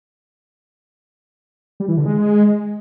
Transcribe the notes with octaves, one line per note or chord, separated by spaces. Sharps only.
G3
E3
D3
G#3